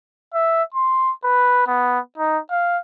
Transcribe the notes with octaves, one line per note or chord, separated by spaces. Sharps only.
E5
C6
B4
B3
D#4
F5